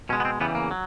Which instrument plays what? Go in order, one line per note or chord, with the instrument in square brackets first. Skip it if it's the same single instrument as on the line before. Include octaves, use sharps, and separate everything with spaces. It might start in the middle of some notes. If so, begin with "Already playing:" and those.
[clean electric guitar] B2 C#4
G#3
B3
C4
E2 C#3 E3 G3 B3
A#3
F#3